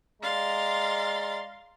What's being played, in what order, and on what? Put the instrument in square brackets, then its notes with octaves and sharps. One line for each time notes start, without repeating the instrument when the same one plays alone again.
[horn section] G#3 D5 A#5 [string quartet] F5 C6 A6